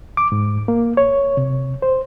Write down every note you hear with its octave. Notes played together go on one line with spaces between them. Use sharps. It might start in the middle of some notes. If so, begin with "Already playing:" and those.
D6
G#2
A#3
C#5
C3
C5